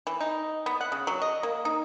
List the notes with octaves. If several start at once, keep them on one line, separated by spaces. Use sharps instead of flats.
E3
D#4
B3
F#5
C#3
F#3
D#5
A#3
D#4